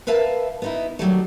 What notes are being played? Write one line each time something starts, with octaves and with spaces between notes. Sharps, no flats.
A#4 B4 E5 F5 A5
B3 D#4 E4
D#3 F#3 G3 A3